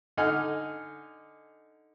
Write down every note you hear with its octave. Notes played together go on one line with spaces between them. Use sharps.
D3 D#4 F#5 G#5 F6